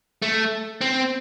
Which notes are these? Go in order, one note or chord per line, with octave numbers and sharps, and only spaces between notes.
A3
C4